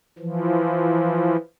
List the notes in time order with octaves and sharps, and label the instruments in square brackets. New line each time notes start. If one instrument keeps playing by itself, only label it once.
[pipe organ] E3 F3